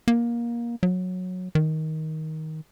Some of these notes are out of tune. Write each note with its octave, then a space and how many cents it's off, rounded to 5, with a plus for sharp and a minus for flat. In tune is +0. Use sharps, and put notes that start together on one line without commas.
A#3 +20
F#3 -15
D#3 +15